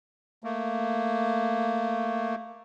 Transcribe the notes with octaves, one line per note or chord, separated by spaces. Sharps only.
A3 A#3